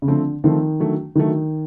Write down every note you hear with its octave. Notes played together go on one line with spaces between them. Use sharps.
C#3
D3 F3 A3 C4
D#3 F3 A3 C4
D3 F#3 A3
D3 D#3 F#3 A3